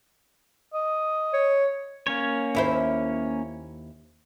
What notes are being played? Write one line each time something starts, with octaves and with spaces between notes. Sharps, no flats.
D#5
C#5
A#3 C#4 C#5
D#2 E4 C5